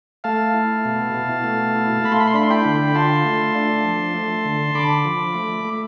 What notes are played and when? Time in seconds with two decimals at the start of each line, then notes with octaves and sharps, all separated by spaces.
0.24 A3 F5 A5
0.54 E4
0.85 B2
1.14 B2
1.44 A3
1.75 E4
2.04 A3 B5
2.12 C6
2.20 B5
2.28 C6
2.34 D4 B5
2.43 C6
2.50 G5 B5
2.65 D3
2.95 F4 A5 C6
3.25 A3
3.55 D4
3.85 F3
4.14 A3
4.45 D3
4.75 D3 B5 D6
5.05 F3
5.35 A3
5.65 A3